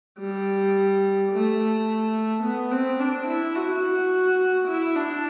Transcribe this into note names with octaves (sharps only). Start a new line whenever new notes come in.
G3
A3
B3
C4
D4
E4
F#4
E4
D4